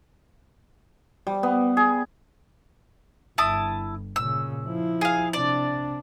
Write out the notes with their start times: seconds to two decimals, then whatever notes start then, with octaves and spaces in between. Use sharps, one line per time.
1.27 G3
1.43 B3
1.77 G#4
3.38 G1 E4 A5 D#6
4.16 A#2 C#3 E6
4.65 F3 E4
5.01 G#4 F5
5.33 C3 D4 D5